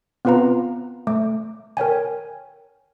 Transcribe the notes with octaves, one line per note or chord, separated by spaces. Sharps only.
B3 C4 F4 B4 F5 A#5
A3 D6
A#4 C#5 G5 G#5